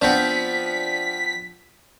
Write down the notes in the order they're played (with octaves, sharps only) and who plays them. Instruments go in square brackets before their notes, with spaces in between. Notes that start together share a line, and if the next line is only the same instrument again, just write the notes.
[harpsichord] F3 C4 [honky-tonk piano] B3 D4 [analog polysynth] B6